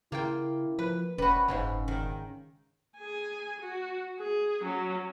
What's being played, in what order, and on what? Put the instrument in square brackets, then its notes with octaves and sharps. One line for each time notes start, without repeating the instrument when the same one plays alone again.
[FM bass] C#3 [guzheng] A#3 F4 G5 [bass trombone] E4
[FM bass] F3 [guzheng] B4
[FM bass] E1 [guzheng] G3 F#4 [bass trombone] C#4 [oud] B4
[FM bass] F#1 [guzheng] G#2 C#3 G#3
[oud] D#3
[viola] G#4 G#5
F#4
G#4
F#3 C#4